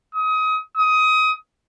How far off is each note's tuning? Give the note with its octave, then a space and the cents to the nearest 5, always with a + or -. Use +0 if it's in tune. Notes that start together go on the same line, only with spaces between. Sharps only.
D#6 +30
D#6 +20